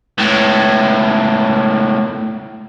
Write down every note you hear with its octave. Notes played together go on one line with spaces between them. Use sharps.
C#2 A2